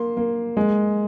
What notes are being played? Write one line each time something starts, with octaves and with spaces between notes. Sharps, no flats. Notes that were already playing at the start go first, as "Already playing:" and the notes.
Already playing: A#3 C6
A#3
G#3